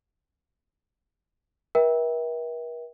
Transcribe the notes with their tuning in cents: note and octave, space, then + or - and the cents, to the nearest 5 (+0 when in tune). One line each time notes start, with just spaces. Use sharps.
A#4 +45 E5 -20 G5 +0